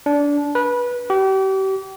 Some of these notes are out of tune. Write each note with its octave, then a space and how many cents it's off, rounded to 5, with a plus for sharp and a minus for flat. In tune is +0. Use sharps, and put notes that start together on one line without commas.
D4 -20
B4 -20
G4 -35